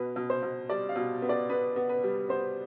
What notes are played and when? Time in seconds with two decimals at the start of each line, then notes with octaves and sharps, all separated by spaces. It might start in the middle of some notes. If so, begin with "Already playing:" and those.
Already playing: B2 B4
0.16 B2
0.30 C5
0.42 B2
0.69 G3 D5
0.89 F5
0.96 B2
1.22 B3
1.29 D5
1.50 B3 B4
1.76 B3
1.89 B4
2.03 G3
2.29 B3 C5